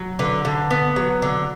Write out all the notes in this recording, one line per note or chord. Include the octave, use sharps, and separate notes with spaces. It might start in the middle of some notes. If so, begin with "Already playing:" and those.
Already playing: F#3
D3 B4
D3
B3
F#3
D3